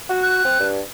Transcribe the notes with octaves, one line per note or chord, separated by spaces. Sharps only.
F#4
F#6
C4
G2